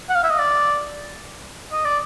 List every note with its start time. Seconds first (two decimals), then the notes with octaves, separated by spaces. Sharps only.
0.09 F#5
0.15 F5
0.23 E5
0.30 D#5
0.39 D5
1.72 D#5
1.85 D5